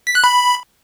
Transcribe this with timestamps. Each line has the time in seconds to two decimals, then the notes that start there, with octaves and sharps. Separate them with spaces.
0.07 B6
0.15 F#6
0.24 B5